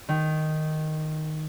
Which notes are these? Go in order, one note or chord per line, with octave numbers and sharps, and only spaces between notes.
D#3